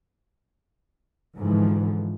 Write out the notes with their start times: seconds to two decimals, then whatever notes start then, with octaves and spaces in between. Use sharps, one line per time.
1.37 G#2 D3 E3 F3